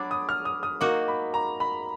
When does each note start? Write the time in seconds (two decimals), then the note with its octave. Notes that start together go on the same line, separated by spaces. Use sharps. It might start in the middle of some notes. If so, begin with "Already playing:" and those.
Already playing: F#3 D4 G#4 B5 D6
0.11 D#6
0.29 F6
0.45 D#6
0.63 D#6
0.81 A#3 D#4 F#4 D6
1.08 B5
1.34 A#5
1.60 B5